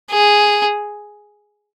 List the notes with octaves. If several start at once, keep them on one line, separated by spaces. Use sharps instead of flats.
G#4